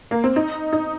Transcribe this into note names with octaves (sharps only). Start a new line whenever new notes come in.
A#3
C4
D#4
D#4